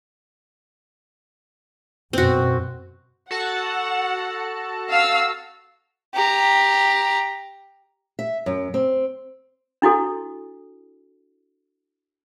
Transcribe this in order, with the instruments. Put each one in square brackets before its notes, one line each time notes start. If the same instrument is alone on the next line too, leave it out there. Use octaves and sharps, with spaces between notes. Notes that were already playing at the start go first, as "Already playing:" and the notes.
[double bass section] F#2 B2 [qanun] C4 F#4
[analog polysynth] F#4 A4 A5 [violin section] F#5
[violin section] F5 E6
[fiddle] G4 A#5
[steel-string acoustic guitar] E5
F#2
C4
[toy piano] D4 E4 F#4 A4